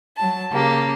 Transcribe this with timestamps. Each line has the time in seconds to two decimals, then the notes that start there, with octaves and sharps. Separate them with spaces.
0.17 F#3 A5
0.53 C#3 A#3 G4